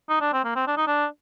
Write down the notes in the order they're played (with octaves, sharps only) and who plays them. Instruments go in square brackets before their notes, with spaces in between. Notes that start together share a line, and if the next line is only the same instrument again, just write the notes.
[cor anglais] D#4
D4
C4
A#3
C4
D4
D#4
D4